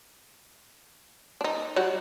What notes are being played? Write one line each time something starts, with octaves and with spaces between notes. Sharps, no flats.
D4 D#4
F#3 G3 F#4